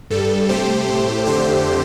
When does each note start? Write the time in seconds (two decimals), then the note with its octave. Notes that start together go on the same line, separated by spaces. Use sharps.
0.10 G2 G3 A4
0.49 C3 A3 G4 C5
0.88 A2 A3
1.26 F2 D3 A3 G4 C5